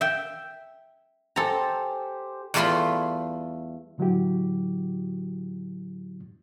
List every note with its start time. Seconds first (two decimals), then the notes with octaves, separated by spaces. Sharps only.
0.01 E5 G5
1.36 G4 A4 C5 G#5 A#5
2.54 E2 G3 A3 F4 B5 C6
3.98 A2 D3 F#3 E4 F#4 G4